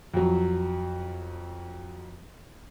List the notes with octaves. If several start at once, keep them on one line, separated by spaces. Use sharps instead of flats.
F2 F#3